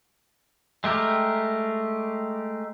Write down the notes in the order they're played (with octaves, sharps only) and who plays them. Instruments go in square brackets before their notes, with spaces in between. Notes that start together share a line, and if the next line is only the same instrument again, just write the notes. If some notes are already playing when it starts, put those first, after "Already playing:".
[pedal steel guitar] G#3 A3 G4 A#4